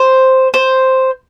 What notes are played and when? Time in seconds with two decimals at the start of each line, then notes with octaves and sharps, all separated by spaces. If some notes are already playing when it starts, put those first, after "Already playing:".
Already playing: C5
0.54 C5